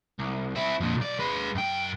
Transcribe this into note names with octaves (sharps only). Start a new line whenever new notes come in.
C2
C4 E4
F2 A#2
B1 D5
G#3 B4
F#2 G5